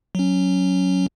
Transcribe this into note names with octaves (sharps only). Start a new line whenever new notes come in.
F#3 C#4